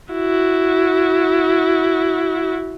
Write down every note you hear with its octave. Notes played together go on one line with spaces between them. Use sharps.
E4 F#4